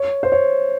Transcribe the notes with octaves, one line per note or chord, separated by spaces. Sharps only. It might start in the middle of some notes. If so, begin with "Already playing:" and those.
Already playing: C#5
C5
C#5